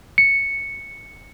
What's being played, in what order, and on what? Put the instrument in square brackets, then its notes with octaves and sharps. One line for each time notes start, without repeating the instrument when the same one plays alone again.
[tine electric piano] C#7